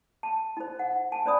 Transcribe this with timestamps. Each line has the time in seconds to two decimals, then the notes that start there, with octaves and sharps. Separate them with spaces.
0.23 A5
0.57 D#4 C5
0.79 F#5
1.12 G#5 A5
1.25 C#4 C5 D5 B5 D#6